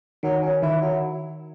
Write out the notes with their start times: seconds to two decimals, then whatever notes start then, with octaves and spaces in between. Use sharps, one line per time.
0.23 D#3 F#3
0.42 C#4
0.62 D#3 E4
0.82 F#3